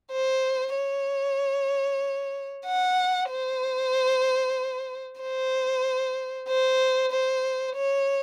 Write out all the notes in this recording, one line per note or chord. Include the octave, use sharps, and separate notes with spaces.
C5
C#5
F#5
C5
C5
C5
C5
C#5